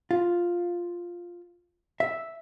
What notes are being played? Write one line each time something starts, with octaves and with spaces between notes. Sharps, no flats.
F4
E5